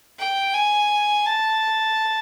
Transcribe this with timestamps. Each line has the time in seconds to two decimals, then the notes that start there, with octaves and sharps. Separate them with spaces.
0.19 G5
0.54 G#5
1.26 A5